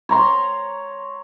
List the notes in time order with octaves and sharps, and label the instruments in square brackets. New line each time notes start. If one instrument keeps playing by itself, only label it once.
[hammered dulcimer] C#5 A#5 C6